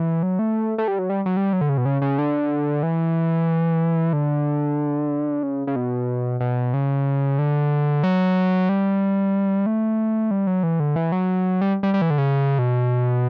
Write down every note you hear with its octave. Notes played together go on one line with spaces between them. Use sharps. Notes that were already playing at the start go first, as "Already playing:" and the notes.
Already playing: E3
F#3
A3
A3
G3
F#3
G3
F#3
G3
F#3
D3
C#3
B2
C#3
C#3
D3
E3
D3
C#3
C#3
B2
B2
C#3
D3
F#3
G3
A3
G3
F#3
E3
D3
E3
F#3
G3
G3
G3
E3
D3
C#3
B2